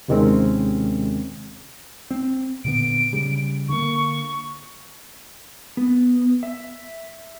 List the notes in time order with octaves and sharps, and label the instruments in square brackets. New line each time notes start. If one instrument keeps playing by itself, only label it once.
[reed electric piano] D#2 C3 D#3 G#3 C4 C#4
[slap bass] C4
[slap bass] A#2 D3 B3 [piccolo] D7
[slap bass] C#3 G3
[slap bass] D3 A#3 [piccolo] C#6
[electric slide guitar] B3
E5